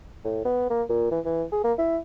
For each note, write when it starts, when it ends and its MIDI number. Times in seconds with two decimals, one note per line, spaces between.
0.24 0.44 45
0.45 0.68 59
0.70 0.83 58
0.89 1.10 46
1.11 1.20 52
1.25 1.43 52
1.52 1.63 68
1.64 1.73 58
1.78 1.98 64